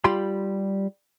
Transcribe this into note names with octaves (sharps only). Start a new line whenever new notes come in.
G3 F4 G4 B5 C6